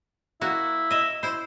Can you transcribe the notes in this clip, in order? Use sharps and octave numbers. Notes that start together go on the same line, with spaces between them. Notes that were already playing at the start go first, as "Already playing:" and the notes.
A#3 E4 F#4
D#5 E5
E4 C5